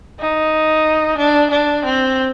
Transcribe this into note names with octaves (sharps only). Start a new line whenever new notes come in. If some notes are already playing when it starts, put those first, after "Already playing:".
D#4
D4
D4
C4